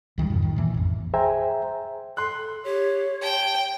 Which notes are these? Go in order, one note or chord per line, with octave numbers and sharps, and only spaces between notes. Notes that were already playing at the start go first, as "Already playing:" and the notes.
C#2 D#3 F3 G3
F2 G#2 B2
D#3
A#2 E3 A#3
A1 F2
G#4 C5 E5 G5 G#5 A#5
A4 C6 F#6
G4 C#5
G5 A5